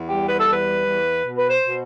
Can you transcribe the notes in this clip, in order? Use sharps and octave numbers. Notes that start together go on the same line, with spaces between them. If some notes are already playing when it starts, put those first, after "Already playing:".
Already playing: E2
G3 G4
B4
A4
E2 B4
E2
B2
B4
C5
B2